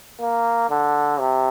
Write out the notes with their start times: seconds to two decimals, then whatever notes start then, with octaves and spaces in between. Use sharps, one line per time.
0.20 A#3
0.70 D3
1.20 C3